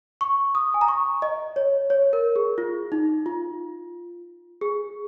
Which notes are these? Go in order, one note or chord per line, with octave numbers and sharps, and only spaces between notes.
C#6
D#6
G#5
A#5
C#6
D#5
C#5
C#5
A#4
G#4
F4
D#4
F4
G#4